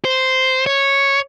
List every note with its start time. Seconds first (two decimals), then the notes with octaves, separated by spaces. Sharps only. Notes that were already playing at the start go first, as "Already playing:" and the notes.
0.05 C5
0.66 C#5